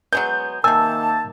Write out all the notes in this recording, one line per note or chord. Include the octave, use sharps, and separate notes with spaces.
F#3 G#3 B3 G6
C3 D#3 A#3 G#5 A5 E6